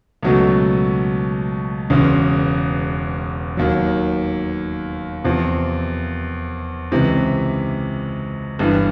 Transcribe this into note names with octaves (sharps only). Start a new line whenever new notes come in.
C#2 B2 F#3 A3
E1 E2 C#3
D#2 D#3 F#3
E2 C3 F3
C#2 C3 E3
G1 G2 E3